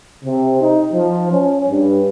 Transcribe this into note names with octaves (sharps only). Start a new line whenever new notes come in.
C3
D#4
F3
C#4
G2